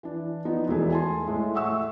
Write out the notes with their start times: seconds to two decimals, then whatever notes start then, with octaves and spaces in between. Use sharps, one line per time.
0.03 E3 D4
0.45 F3 B3 D#4
0.68 E1 A3 E4 G#4
0.92 G#5 A5 C6
1.26 A2 G#3 A3
1.55 E5 F#5 C#6 E6